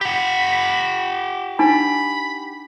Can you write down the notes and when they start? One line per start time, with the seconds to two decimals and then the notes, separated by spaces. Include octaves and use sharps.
0.01 G4 F#5 B5
1.59 D4 D#4 G#5 B5